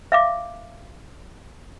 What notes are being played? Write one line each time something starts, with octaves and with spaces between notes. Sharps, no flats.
E5 F5 D6